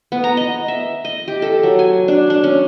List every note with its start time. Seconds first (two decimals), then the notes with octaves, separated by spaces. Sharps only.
0.12 B3
0.24 A#5
0.37 D#5
0.68 E5
1.05 D#5
1.28 G4
1.42 A4
1.63 F#3
1.79 G#5
2.08 D4
2.30 D4
2.44 C#4